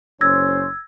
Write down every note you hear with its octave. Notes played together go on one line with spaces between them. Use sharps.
F#1 C#4 C5 E6 G#6 A#6